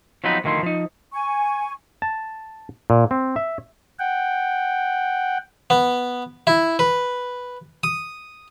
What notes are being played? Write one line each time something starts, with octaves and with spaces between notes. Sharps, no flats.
F3 F#3 B3 C4 D#4 B4
D2 D#3 F3 E4 C6
F3 D#4
G#5 C#6
A5
A#2
C4
E5
F#5 G5
B3
E4
B4
D#6